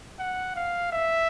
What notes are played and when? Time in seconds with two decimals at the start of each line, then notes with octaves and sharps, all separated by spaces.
0.19 F#5
0.56 F5
0.93 E5